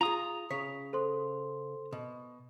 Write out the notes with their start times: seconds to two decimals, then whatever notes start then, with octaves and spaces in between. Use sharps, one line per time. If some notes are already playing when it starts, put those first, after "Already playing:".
0.01 F4 G#4 A#5 D#6
0.51 C#3 C#5 B6
0.93 A4 C5 C6
1.93 B2